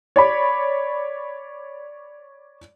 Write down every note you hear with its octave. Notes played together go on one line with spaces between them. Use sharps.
C#5 D5 B5